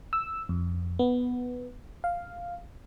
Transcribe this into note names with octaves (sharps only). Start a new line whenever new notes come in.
E6
F2
B3
F5